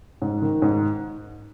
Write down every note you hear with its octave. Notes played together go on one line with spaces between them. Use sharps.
G#2
D#3
G#2